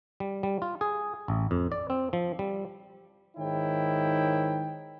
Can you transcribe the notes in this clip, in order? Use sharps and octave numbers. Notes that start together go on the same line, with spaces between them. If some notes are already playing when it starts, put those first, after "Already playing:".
G3
G3
F4
G#4
A1
F2
D5
C4
F3
G3
G#2 D#3 D#4 E4 C#5 G5